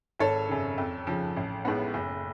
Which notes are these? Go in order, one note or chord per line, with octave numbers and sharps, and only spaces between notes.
G#1 A4 C#5
F#2 C#3
F2
C#3 F3
A1
A2 G#3 B3
F#1